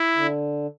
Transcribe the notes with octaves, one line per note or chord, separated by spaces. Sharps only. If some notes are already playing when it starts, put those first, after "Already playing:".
Already playing: E4
D3